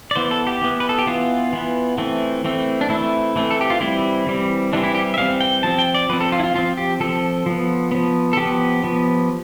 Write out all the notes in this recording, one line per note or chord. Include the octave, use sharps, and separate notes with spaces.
D5
E3 B3 C5
A4
G4
E3 B3
B4
A4
G4
E3 B3 F4
E3 B3
E3 A3 C4
E3 A3 C4
D4
E3 A3 C4 E4
E3 A3 C4
A4
G4
F4
E3 G3 C4 E4
E3 G3 C4
E3 G3 C4 D4
E4
G4
E5
E3 G3 C4 F5
G5
F3 C4 A5
G5
D5
F3 C4 B4
A4
F4
E4
F4
F3 C4 F4
G4
F3 C4 A4
F3 B3
F3 B3
A4
F3 B3 G4
F3 B3